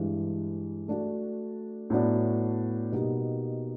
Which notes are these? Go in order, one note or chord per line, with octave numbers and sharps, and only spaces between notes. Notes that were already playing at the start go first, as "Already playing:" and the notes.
Already playing: G2 E3 G#3
A3 D4 F#4
A2 F#3 B3 D4
B2 G3 A#3 D#4 G4